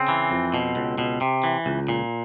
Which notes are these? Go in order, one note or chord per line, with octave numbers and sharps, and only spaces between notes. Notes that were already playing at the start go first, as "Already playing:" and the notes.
Already playing: C#3 C4
E3
F2
B2
C#2
B2
C3
E3
C#2
A#2